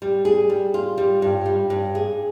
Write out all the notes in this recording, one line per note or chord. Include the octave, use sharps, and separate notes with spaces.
G3
G#4
G3
F4
G3
G2
G3
G2
G#4